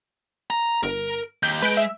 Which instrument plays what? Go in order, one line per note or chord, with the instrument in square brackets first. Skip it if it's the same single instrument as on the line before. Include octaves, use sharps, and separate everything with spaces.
[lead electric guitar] A#5
[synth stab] G1 [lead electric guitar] A#4
[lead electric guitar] D#2 [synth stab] G6
[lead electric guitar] G#3 [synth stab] B4 G6 D7
[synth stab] E5